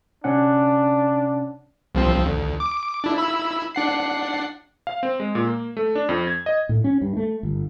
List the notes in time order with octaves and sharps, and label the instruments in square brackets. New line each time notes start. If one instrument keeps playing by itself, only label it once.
[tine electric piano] C3 C#4 F#5 [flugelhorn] D4
[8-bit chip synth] C2 F3 C4
D2
D6
D4 E4
E4 B5 E6
D4 F#5 C7
[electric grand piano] F5
C4
G#3
A#2
A#3
A3
D4
F2
G#6
D#5
[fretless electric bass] A2
C#4
G2
A3
G1